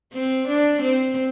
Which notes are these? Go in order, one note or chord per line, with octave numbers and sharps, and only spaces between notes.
C4
D4
C4